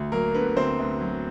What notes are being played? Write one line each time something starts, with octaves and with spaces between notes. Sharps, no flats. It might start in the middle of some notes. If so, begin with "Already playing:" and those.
Already playing: D2
F#3 A#3 A#4
D3 B3 B4
D2 C4 C5
D2
F#3